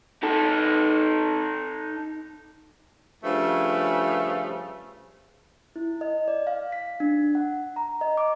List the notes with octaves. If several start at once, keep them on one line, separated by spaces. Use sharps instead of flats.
D#4 A4
G2 C#3 F3 A3
E4
D#5
D5
F5
B6
D4
F#5
A#5
D#5
D6